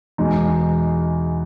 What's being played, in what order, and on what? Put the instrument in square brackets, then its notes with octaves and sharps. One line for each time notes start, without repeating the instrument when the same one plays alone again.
[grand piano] E2 B2 G#3 D#4